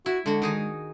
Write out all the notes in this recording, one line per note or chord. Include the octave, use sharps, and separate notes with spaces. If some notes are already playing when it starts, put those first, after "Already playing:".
E4 F#4
D3 G#3 F#4
D#3 D#4 G#4